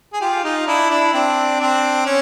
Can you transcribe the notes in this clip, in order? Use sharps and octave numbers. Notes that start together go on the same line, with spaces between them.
G#4
F4 G4
D#4 F4
D4 E4
D4 E4
C4 D4
C4 D4
C#4